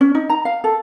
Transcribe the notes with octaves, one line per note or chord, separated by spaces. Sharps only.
C#4
D#4
A#5
F5
A4